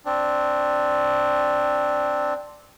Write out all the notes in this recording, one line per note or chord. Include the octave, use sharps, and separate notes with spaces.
C4 D4